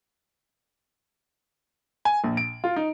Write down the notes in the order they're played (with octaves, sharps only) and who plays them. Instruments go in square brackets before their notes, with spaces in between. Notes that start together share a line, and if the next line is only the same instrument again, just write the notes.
[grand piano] G#5
A#1
D7
F4
D#4